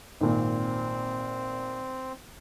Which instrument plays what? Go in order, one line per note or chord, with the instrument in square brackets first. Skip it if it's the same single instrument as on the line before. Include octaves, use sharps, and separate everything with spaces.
[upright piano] G#1 A#2 [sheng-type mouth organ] C4